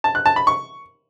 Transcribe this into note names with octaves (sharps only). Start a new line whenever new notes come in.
A5
F#6
A5
B5
C#6